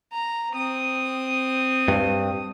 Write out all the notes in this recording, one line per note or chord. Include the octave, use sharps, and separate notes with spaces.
A#5
C4 D#6
G2